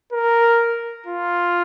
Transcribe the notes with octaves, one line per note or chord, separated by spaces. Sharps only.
A#4
F4